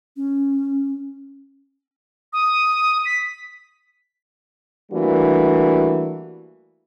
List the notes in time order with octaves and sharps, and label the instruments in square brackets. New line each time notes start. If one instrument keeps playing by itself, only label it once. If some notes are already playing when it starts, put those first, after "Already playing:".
[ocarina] C#4
[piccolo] D#6
B6
[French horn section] E3 G3 A3 A#3 D4 F#4